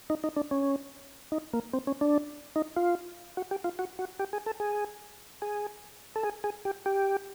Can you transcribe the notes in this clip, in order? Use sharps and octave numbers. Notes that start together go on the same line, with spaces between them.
D#4
D#4
D4
C#4
D#4
A#3
C4
C#4
D4
D#4
F4
F#4
G4
F4
F#4
F#4
G4
G#4
A4
G#4
G#4
A4
G#4
G#4
G4
G4